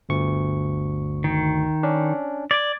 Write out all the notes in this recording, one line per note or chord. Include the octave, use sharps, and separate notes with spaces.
G1 D2 C#6
D#3
C#4 D4
D5 D6 G#6